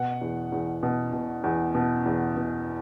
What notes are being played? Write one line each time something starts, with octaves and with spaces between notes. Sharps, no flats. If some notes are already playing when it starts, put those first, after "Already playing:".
Already playing: B2 F#5
E2
E2
B2
B2
E2
B2
E2
B2